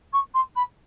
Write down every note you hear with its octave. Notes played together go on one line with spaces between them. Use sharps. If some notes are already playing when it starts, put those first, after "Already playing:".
C#6
C6
B5